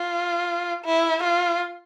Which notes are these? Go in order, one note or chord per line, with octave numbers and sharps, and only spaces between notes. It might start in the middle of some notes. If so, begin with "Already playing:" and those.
Already playing: F4
E4
F4